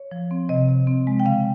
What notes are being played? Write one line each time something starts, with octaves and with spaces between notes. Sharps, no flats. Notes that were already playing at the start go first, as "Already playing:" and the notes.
Already playing: C#5
F3
C4
C3 D#5
C3
C4
G#3
G5
C#3 F5